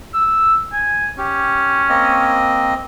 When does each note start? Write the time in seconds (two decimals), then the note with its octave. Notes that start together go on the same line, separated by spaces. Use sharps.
0.13 E6
0.72 G#5
1.18 C#4 G4
1.89 A#3 C4 D#5